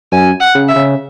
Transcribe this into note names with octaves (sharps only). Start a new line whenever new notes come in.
F#2 G#5
F#5
C#3
E5
C#3